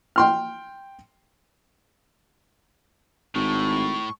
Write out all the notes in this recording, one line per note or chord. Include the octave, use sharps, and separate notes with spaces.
G5 C6 F6
G#1 A2 C#6